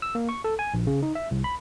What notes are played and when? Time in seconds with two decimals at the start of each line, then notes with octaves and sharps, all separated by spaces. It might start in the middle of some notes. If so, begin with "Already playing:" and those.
0.02 E6
0.15 A#3
0.29 C#6
0.44 A4
0.59 G#5
0.74 A#1
0.87 C#3
1.03 D#4
1.15 E5
1.31 C2
1.44 B5